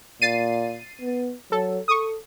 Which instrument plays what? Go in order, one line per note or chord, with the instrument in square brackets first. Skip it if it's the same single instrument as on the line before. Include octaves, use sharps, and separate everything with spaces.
[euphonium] A#2 [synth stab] A6 C7 D#7
[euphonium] B3
[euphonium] F#3 [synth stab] A4
[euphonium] A4 [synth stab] C#6 D#6